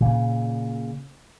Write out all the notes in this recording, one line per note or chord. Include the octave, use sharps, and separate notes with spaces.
A#2 C#3